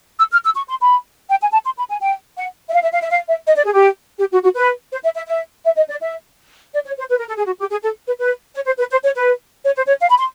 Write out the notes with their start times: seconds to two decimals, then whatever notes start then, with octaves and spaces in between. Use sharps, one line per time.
0.19 E6
0.32 F6
0.44 E6
0.56 C#6
0.69 C6
0.80 B5
1.29 G5
1.42 G#5
1.53 A5
1.65 C6
1.78 B5
1.90 G#5
2.01 G5
2.37 F#5
2.69 E5
2.74 F5
2.83 E5
2.93 F5
3.02 E5
3.10 F5
3.28 E5
3.46 D#5
3.56 D5
3.65 G#4
3.73 G4
4.19 G4
4.32 F#4
4.43 F#4
4.56 B4
4.92 C5
5.04 E5
5.16 E5
5.28 E5
5.65 E5
5.77 D#5
5.89 D5
6.01 E5
6.73 D5
6.86 C#5
6.98 C5
7.10 B4
7.19 A#4
7.28 A4
7.38 G#4
7.46 F#4
7.59 G4
7.70 G#4
7.83 A4
8.07 B4
8.19 B4
8.55 C#5
8.67 C5
8.79 B4
8.91 C5
9.04 C#5
9.16 B4
9.65 C#5
9.76 C5
9.88 C#5
10.01 F5
10.09 B5
10.18 C6